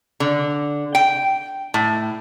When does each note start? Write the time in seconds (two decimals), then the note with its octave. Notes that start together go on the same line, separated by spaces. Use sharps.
0.20 D3
0.95 G5
1.74 A2